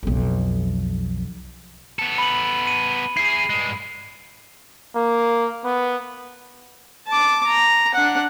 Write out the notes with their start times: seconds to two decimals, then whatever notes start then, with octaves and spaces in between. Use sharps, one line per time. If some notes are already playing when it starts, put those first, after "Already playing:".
0.03 B1 F2
1.99 B3 A4
2.18 B5 F#7
2.67 D#7
3.17 E4 G#4 C7
3.50 G2 G#3
4.96 A#3
5.64 B3
7.08 A5 D6
7.46 A#5
7.94 D4 F#5